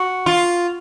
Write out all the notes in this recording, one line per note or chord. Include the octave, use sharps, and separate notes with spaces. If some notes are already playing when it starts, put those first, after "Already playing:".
Already playing: F#4
F4